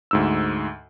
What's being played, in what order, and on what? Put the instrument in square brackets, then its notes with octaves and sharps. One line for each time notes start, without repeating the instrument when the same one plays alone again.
[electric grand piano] D2 G#2 E6